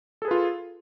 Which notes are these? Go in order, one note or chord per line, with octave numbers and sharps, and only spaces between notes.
F4 G#4 A4 B4